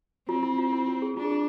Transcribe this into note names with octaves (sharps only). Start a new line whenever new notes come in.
C4 F4
E4
F4
E4
F4
G#4
D4 F4
G#4
F4